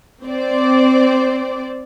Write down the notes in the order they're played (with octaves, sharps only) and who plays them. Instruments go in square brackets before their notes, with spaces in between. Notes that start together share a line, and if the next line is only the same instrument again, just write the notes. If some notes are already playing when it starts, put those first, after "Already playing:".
[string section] C4 C5 D5